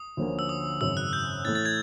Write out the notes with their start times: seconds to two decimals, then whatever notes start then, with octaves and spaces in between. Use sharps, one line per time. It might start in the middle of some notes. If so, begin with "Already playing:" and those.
Already playing: D#6
0.17 D2 D3 F3 A#3 C#4
0.39 E6
0.49 D#6
0.81 G#1 F#2 C#3 E6
0.97 F#6
1.13 G6
1.45 A2 E3 A3 A6
1.55 A6
1.66 G#6